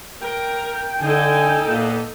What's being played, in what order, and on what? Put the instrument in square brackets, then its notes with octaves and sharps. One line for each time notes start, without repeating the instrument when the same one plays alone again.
[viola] A#4 [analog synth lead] G5
[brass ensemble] D3 G#5 [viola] D#4 A4
[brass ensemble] A#2 A#3 B3